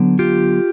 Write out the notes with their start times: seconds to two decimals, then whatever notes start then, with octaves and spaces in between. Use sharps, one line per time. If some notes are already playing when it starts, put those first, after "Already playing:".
Already playing: D3 F#3 B3
0.19 F4 G4